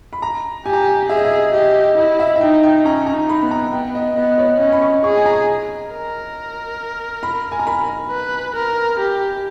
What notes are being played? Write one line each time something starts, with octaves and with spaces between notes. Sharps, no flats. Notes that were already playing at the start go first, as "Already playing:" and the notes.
B5
A#5
G4 G#5
A#5
G#5
G#4 E5
D#5
E5
G4 D#5
E4 D#5
E5
E5
D#4 G5
G5
C#4 A#5
A#5
D#4
B5
B3
A#5
B3 G5
D#5
B3 D#5
C#5
C#4 D#5
B5
C#6
G#4 C#6
G#5
A#5
A#4
B5
G#5
A#5
B5
B4
A#4
G4